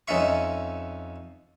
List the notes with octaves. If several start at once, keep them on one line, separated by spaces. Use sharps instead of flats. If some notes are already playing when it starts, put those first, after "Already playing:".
F2 C#4 D#4 E5 C#6